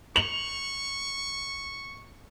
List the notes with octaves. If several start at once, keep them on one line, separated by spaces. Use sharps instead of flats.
C#6 F7 F#7